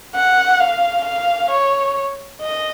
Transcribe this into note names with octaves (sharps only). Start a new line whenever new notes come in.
F#5
F5
F5
C#5
D#5